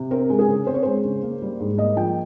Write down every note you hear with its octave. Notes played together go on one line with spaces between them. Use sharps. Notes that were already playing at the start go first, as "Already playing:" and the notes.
Already playing: C3
C4 A#4
G#3
G#4
C#3
C4 C5
C#5
G#3 C5
C#3
A#3
G3
G#2
A#3 D#5
F3 G5